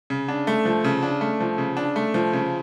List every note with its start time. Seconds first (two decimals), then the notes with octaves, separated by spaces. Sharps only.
0.10 C#3
0.28 D4
0.47 A3
0.65 F3
0.84 C#3
1.03 D4
1.21 A3
1.40 F3
1.58 C#3
1.77 D4
1.96 A3
2.14 F3
2.33 C#3